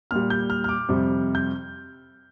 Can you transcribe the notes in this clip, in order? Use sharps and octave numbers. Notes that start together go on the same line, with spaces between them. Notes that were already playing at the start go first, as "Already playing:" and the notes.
A#2 G3 F6
G6
F6
F6
D6
F2 C3 G3
G6